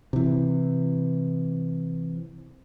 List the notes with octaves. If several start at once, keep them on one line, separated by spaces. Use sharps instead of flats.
C3 E3